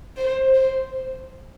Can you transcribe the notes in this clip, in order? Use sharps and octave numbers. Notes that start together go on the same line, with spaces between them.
C5
C5